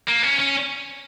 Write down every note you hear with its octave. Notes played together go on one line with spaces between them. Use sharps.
A#3
C#4
C#4